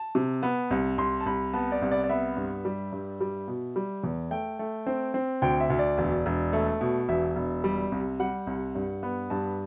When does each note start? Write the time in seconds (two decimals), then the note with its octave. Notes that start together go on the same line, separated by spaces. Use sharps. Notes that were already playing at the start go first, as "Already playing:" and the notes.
Already playing: A5
0.15 C3
0.43 B3
0.71 C2
0.98 C2 C6
1.21 A5
1.26 C2 B5
1.54 B3 A5
1.72 D5
1.82 C2
1.91 D5
2.04 D5
2.09 B3 E5
2.37 G2
2.65 G3
2.92 G2
3.21 G3
3.48 B2
3.76 G3
4.04 E2
4.31 A3 G5
4.59 A3
4.87 C4
5.14 C4
5.42 D2 G5
5.60 E5
5.70 D2
5.79 D5
5.98 E1
6.26 E1
6.53 A3
6.81 B2
7.09 E1 E5
7.36 E1
7.64 G3
7.92 C2
8.20 G3 F#5
8.47 C2
8.75 G2
9.03 B3
9.30 G2 A5